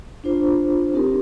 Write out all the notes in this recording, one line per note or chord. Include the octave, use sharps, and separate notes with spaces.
D4 F4 C5
C4 D#4 G4 A#4